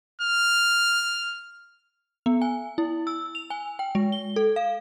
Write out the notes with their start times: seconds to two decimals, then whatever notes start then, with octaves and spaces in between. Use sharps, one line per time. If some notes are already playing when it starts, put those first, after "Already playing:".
0.22 F6
2.26 B3
2.42 G#5
2.78 E4
3.07 E6
3.35 F7
3.50 G#5
3.79 G5
3.95 G#3
4.12 G7
4.36 A4
4.56 F5